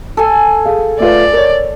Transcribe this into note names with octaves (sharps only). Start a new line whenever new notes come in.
A4 G#5
G#4 F5
A3 F4 B4 D5
A#4 C#5